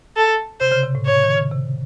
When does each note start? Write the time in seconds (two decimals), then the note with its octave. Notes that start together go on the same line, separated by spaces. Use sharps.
0.16 A4
0.60 C3 C5
0.72 C#3
0.83 C3
0.95 A2
1.05 C#5
1.24 D#3
1.36 C#3
1.51 C3